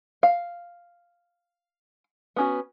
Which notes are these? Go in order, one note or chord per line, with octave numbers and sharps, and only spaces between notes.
F5
B3 C#4 F#4